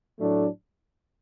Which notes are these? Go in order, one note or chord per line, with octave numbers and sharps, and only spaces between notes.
A2 F#3 A3 D4